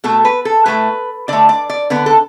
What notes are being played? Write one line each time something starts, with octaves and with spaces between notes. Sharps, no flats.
B2 A3 A4
B4
A4
A2 A3 B4
D3 A3 D5
D5
D5
D3 B3 B4
A4